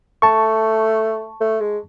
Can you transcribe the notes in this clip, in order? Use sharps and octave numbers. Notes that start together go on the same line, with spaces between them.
A3 A5 C#6
A3
G#3